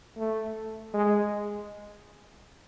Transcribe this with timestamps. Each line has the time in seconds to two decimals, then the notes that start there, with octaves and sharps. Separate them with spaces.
0.18 A3
0.94 G#3